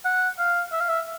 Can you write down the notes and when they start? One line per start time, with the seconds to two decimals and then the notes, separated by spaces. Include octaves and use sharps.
0.05 F#5
0.39 F5
0.72 E5
0.81 F5
0.89 E5